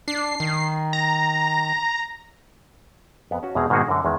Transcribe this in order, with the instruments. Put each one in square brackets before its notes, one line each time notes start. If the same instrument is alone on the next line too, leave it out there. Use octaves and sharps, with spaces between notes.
[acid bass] D4 [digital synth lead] C7
[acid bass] D#3
[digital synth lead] A#5
[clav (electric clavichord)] F2 B3
C#4 F#4
E2 B2 G#3 C4 G#4 A#5
G#2 B2 D#3 A#3 F#4 G#4
F#2 D3
E2 D#3 G#3 E4